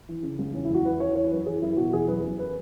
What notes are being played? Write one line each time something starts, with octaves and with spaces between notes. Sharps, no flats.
E3
C#3
C#2
E2 C#4
E4
E2
F#4
E2 B4
E3 C#5
E3 C#5
F#2 B4
E3 G#4
F#2 E4
B2 F#4
E2 G#4
F#2 B4
F#2
B4